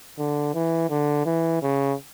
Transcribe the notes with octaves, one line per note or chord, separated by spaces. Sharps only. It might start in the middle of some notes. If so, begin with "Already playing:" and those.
D3
E3
D3
E3
C#3